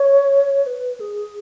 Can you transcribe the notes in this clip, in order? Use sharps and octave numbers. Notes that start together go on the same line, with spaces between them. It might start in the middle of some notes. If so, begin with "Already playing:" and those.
Already playing: C#5
B4
G#4